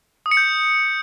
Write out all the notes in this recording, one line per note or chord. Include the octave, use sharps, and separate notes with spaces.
D#6
C#7
G6